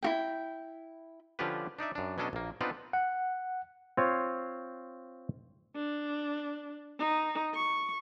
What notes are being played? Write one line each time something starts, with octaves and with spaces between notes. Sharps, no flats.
E4 F#4 G5
D3 F3 C#4 F4 G4 B4
D4 D#4 D5 E5
F#2 D4
B2 F#3 C#4 D4 A4 D#5
A#1 A#3
B3 C4 D4 D#4 F4 B4
F#5
C4 F4 C#5
D4
D#4
C#6